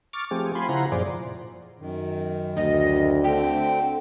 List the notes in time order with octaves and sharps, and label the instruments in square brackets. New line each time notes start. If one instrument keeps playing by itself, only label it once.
[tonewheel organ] C#6 D6 F6 A6
F3 A3 C4 G4 G#4
F4 G#5 B5 C6
C#3 E4 F4 C5 F#5 A#5
F#2 A#2 F3 G#4 C5 D5
[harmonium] F#2 D#3
[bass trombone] D2 [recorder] D#5
[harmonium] D3 A3 C4 [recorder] G5